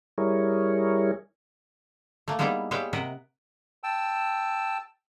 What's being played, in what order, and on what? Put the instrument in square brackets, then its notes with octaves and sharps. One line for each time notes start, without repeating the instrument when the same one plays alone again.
[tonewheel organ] G3 E4 G#4 A#4 C#5
[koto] A3 A#3
G3 G#3 A#3 B3 D#4 E4
G3 G#3 C#5 E5 F5 G5
C3 A#4 D#5 E5 F#5
[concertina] G5 A5 E6